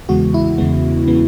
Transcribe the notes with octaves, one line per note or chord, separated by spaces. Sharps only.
E2 C#3 E3 G#3 B3 F#4
E4
E2 C#3 E3 G#3 B3
C#3 E3 G#3 B3